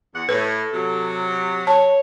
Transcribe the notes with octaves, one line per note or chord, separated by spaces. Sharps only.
E2 F#5
A2 A4 B4
C3 F#3
C#5 A5